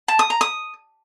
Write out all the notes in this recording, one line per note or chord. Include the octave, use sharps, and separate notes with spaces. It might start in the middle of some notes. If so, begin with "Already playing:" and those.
A5
D#6
A#5
D#6